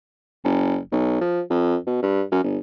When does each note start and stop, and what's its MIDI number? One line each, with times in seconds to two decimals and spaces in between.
0.44 0.77 30
0.92 1.20 35
1.21 1.41 53
1.50 1.76 41
1.87 2.02 47
2.02 2.23 43
2.32 2.43 42
2.44 2.58 31